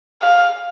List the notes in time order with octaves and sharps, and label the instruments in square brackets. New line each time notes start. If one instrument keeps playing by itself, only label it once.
[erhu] F5